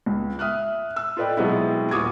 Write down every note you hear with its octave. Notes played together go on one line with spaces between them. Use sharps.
C#2
E5 D#6 F6 F#6
E6
F4 A4 B4 D5 D#5 G5
B2 F#3 G#3 B3 C4 E4
D#1 F4 F#4 D6 D#6 G#6